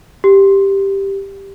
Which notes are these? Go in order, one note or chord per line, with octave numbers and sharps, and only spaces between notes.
G4